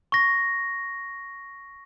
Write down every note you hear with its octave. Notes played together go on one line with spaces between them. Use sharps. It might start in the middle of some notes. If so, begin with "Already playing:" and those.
C#6 A#6